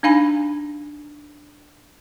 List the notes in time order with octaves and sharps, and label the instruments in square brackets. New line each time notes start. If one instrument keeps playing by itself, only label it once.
[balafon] D4 D#4 F5 G#5 B5